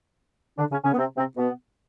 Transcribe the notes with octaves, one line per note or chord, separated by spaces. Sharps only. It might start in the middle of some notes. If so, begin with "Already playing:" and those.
D3 D4
C#3 C#4
C#3 C#4
B3
C3 C4
C3 C4
B2 B3